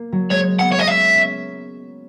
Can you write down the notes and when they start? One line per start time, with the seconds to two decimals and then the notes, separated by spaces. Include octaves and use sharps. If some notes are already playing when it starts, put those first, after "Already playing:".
Already playing: A#3
0.12 F#3
0.30 G#3 C#5
0.59 B3 F#5
0.72 C#5
0.79 D#5
0.87 C#4 E5
1.16 C#4